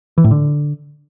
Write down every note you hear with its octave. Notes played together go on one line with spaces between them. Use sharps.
E3
A2
D3